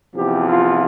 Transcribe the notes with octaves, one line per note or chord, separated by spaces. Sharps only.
E2 C3 F3 G4
F4